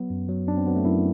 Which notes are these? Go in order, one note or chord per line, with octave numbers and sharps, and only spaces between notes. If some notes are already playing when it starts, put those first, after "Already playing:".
Already playing: F#3 B3
F#2
F#3
F#2 D4
C4
F#3 B3
A3
F#2 E4